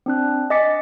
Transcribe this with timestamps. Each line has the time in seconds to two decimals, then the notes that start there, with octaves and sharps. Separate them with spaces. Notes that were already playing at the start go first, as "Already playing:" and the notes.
0.06 C4 D4 F#6
0.50 D#5 G#5 D6 A6 B6 C#7